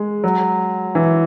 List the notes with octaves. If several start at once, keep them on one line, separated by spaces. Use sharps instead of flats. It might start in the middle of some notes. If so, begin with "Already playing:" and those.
Already playing: G#3
F#3
E3